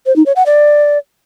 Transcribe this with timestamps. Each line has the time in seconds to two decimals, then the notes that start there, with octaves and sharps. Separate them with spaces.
0.06 C5
0.16 D#4
0.26 C#5
0.36 F#5
0.46 D5